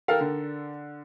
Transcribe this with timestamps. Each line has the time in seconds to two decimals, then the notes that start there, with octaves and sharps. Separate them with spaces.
0.08 A4 A#4 F5 G5
0.21 D3